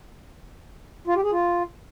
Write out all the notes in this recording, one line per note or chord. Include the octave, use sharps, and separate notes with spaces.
F4
G4
G#4
F4